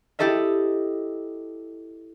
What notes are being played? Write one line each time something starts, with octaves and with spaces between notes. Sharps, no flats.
E4 G4 A4 D#5 E5